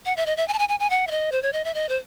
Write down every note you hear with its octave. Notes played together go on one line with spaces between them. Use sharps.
F#5
E5
D#5
E5
G#5
A5
G#5
G#5
G#5
F#5
E5
D#5
C5
C#5
D#5
E5
D#5
C5